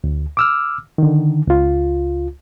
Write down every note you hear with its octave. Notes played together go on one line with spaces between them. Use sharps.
D2
D6 E6 F6
D3 D#3
C#2 F4